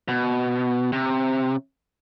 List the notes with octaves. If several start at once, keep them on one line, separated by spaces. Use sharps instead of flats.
B2
C3